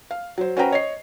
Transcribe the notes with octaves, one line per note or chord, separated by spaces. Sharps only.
F5
F#3 C5
C#4 F#4 B4 C5 G5 A#5
C#5 D#5 C7